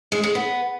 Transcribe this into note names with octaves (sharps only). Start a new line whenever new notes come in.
G#3
G#3
B3